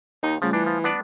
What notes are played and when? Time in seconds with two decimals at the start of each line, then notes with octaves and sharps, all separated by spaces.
0.23 D#2 D#4
0.42 C#3 F3 G3 A3 F4
0.53 E3 D4
0.66 F3 B5
0.84 B3 D4 D5